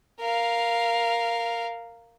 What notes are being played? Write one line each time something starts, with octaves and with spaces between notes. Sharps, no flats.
A#4 F5